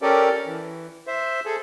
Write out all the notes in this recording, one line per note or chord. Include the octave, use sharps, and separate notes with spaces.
C#4 G4 A4 A#4 D5
E3
C5 E5
G#4 A4